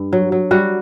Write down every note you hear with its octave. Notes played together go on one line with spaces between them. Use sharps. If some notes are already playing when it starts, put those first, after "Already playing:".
Already playing: G2
F#3
F#3
G3 F#4